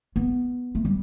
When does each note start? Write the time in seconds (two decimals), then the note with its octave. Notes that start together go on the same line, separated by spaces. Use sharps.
0.16 B3
0.75 A3
0.85 G3